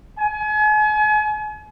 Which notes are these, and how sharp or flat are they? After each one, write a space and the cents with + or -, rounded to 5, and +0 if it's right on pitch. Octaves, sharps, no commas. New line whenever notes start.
G#5 +40